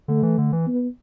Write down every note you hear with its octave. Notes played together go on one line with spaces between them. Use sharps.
D3 A3
E3
D3
E3
B3